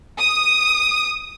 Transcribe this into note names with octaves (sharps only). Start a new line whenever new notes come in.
D#6